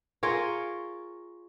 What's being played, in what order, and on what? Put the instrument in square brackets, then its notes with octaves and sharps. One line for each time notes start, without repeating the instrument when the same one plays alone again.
[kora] F4 G#4 A#4 C#5